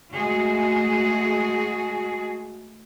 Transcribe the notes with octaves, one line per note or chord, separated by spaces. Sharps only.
G#3 A3 F#4 G#4